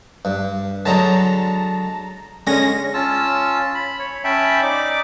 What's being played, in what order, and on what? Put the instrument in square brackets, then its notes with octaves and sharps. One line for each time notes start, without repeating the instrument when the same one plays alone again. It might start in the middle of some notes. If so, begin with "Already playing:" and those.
[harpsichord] G2
[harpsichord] D3 F#3 G#3 [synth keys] A5 A#5
[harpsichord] D3 G#5 [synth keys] G#3 C#4 A#6
[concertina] C#4 F4 A5 E6
B5
C#5
C#4 E5 G5 A5 B5
D#4 D5 D6